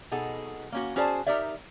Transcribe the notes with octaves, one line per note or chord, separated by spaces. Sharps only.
B2 D#4 G#4 A4 F#5
A#3 C#4 F#4
C#4 F#4 G#4 C5 D5 A5
D#4 G4 A#4 D5 E5